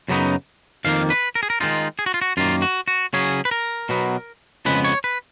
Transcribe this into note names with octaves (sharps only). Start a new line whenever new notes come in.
F#2 C#3 F#3 B3 D#4
F2 D#3 A#3 F5
B4
A#4
G#4
A#4
D#3 G#3 D#4 F4
G#4
F#4
F4
F#4
F#2 D#3 A#3 F4
F#4
F#4
C#3 F#3 C#4 G#4
B4
A#4
B2 F#3 B3
F2 C#3 G#3 B3 B4
C#5
B4